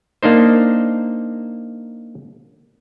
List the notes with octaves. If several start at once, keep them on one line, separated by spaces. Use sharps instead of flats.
A#3 D4 D#4 C5